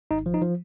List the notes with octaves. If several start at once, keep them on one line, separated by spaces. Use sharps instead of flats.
G#1 D#4
F3
D#4
F3